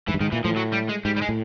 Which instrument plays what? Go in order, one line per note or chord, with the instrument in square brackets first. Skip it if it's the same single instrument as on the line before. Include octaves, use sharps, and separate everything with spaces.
[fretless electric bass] G#2 [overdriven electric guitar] E3
[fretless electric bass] G2
[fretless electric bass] G#2 [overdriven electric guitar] D#3
[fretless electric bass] A#2 [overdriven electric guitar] E3
[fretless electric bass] A2 [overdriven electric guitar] F3
[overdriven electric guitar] F#3
G3
G#3
[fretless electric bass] G#2 [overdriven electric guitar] G3
[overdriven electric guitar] G3
G#3
[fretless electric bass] A2